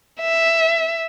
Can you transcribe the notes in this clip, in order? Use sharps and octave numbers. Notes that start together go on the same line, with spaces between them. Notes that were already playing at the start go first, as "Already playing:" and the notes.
E5